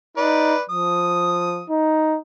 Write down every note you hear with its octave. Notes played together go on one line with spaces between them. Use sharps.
D#4 B4 D5
F3 D#6
D#4